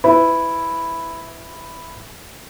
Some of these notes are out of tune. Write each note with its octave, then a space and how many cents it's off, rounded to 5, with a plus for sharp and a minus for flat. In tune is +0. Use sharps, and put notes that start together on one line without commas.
E4 +0 B4 +25